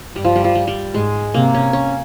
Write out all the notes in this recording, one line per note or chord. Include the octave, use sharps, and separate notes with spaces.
G2 G3
F3
G3
F3
G3
G3
G#2 G#3
C3 A#3
C#4
C#4